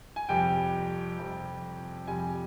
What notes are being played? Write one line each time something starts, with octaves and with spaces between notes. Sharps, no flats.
G#5
F2 C3 G3 G5
F2 C3 G3
F2 C3 G3 G#5